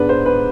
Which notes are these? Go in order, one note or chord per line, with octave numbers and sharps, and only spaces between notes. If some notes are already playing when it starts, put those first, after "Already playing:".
Already playing: G#2 G#3 B3 D4 B4
C5
B4